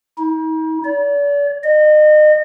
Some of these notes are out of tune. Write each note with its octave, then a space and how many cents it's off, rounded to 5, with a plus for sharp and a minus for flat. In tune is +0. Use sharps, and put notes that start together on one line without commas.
D#4 +40
D5 -40
D#5 -35